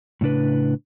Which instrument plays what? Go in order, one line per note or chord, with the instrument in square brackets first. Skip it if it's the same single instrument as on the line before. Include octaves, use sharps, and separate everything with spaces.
[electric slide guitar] A2 C#3 D4 B4